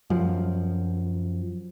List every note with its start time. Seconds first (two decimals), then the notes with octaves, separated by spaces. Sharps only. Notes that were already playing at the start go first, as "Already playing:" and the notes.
0.10 F#2 F3